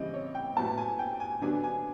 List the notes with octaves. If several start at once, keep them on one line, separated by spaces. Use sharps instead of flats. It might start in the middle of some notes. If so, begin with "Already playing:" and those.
Already playing: C#3 E3 G3 C4 D#5
C#5
G5
A2 F#3 B3 A5
G#5
G5
G#5
D3 F#3 B3 D4 G#5
G#5